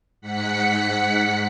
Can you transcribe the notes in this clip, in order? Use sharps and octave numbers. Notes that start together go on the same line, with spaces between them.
G#2 F#5 B6 C#7